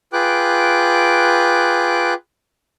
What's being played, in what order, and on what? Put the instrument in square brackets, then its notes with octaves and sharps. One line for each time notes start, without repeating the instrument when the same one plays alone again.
[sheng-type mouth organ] F4 G#4 B4 G5 D6 F#6